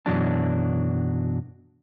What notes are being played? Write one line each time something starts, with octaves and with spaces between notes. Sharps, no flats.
F#2 B2 E3 F#3 D4 A5